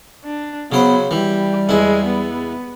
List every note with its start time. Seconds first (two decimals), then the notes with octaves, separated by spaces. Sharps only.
0.24 D4
0.72 C#3 F#3 B3 C5
1.11 E3 G3 G4
1.69 E2 G#3 E4
2.06 B3